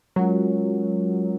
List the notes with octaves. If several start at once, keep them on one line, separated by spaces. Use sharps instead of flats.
F#3 G#3 C#4 F4 A#4 C#5